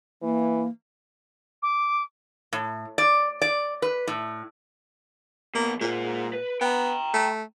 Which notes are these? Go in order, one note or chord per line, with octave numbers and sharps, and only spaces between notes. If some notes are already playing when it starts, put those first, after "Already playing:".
E3 A#3
D6
A2
D5
D5
B4
A2
B1 B2 A#3
A#2 G#3 C5
B4
B3 G5 A#5
A3